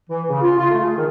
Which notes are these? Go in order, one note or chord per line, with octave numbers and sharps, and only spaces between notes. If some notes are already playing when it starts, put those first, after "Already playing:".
E3
C#3
F4
F4
A3
G#4
D#3